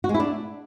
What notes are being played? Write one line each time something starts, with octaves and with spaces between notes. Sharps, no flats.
F#4
G#3
E4
D4